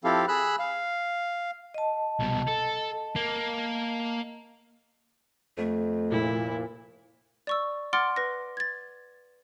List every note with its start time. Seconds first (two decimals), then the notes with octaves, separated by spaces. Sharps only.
0.04 F3 C4 E4 G4 A4 F5
0.28 G#4 B5 E6 F#6
0.59 F5
1.74 D#5 A5
2.20 C2 B2
2.48 A4
3.16 A#3
5.58 F2 A3
6.12 F1 A#2 E4
7.47 D5 C#6 E6
7.93 F#5 C6 D6 F6 A6 D7
8.16 B4 A#6
8.57 G#6 A6